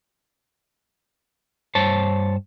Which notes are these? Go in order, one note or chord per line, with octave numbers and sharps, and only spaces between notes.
G2 C5 C#5 A5